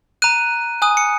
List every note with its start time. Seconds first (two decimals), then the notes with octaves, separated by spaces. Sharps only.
0.22 A#5 F#6 D#7
0.82 G#5 D#6 F#6
0.97 C#7